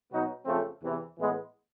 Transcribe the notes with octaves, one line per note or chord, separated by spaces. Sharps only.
B2 F#3 B3 D#4 F#4
F2 C#3 F3 A3 C4
E2 C3 E3
A2 E3 G#3 B3